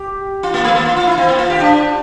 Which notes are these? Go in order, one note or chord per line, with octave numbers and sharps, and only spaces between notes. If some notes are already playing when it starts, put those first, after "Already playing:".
Already playing: G4
F4
A#3
A3
A#3
F4
F4
E4
C4
A#3
F4
G4
D4